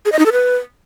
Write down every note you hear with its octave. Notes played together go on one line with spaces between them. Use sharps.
G#4
D#5
D#4
A4
B4